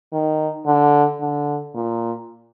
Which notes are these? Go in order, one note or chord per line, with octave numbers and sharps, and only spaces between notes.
D#3
D3
D3
A#2